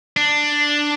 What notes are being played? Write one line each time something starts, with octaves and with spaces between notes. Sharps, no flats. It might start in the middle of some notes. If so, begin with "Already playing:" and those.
D4